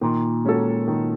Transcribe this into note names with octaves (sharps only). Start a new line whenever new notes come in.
A#2 D#3
G#3 C#4 F#4 A4
D#3